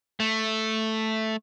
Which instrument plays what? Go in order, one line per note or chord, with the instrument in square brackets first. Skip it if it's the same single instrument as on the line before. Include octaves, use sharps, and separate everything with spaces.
[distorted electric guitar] A3